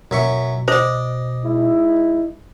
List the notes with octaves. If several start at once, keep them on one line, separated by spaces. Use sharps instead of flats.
F#2 B2 E5 C#6
C5 D5 D#5
G#3 D#4 E4